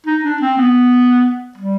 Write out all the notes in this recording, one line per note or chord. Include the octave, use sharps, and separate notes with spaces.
D#4
D4
C4
B3
G3